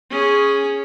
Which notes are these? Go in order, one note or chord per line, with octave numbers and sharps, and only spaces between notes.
C#4 G#4